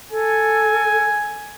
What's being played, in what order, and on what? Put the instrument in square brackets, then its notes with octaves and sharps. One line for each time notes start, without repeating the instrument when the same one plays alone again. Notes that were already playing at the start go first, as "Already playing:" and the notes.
[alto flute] A4 [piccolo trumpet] G#5